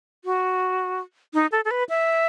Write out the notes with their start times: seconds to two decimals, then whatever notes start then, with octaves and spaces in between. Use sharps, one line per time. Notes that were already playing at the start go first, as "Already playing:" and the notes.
0.25 F#4
1.34 D#4
1.52 A4
1.65 A4
1.71 B4
1.89 E5